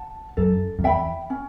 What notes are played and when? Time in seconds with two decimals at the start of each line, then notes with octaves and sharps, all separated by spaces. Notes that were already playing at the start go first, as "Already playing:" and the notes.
Already playing: F#5 A5
0.37 F#2 A4
0.79 F#2
0.83 E2 E5 G5 B5
1.30 C#4